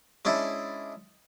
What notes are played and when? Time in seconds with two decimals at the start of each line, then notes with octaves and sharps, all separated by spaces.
0.25 G#3 C#4 D4 E4